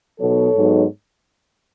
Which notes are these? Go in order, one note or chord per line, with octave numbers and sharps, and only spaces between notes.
B2 F#3 B3 D#4 A4 C#5
G#2 F#3 B3 D#4